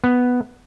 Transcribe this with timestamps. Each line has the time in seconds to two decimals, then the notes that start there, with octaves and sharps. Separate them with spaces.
0.04 B3